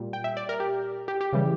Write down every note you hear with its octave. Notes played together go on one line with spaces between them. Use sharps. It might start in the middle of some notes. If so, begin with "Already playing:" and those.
Already playing: A#2 G3
G5
E5
D5
A#4
G4
G4
G4
C#3 E3 G3